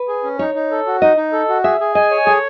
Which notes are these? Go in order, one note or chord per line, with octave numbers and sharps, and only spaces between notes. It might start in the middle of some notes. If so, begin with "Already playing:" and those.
Already playing: B4
G#4
C#4
D#4 C#5
D#4
A4
F#4
D#4 D#5
D#4
A4
F#4
G#4 E5
G#4
D#5 G#5
C#5
G#4 A4